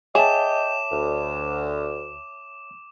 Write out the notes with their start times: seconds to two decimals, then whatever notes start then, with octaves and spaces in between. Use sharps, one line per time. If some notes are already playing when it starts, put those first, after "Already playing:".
0.15 G#4 C#5 D#5 E5 G5 A5 D6 E7
0.92 D2